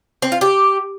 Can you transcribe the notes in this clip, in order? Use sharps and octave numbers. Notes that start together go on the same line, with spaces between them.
C4
F4
G4